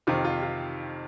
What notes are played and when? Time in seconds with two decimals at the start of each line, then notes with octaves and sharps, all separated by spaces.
0.07 F2 C3 D#3 F4
0.25 F4
0.43 F4